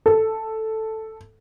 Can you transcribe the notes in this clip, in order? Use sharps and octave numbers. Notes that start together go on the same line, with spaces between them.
A4